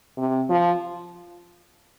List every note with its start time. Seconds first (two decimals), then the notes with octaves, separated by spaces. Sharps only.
0.17 C3
0.50 F3